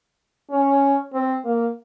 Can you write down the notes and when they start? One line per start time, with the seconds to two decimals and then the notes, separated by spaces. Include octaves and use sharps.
0.51 C#4
1.13 C4
1.45 A#3